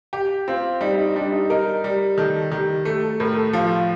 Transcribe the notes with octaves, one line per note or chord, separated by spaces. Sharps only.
G4
C4 F4
G3 D#4
D#4
G3 D4
D#4
D#4 A#4
G3
D#3 A4
D#3 G4
A3 G4
A4
A2 A#4
A4
F3 F4